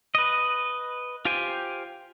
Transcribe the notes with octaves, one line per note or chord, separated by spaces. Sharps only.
B4 D#5
F4 G4 C5 G5 G#5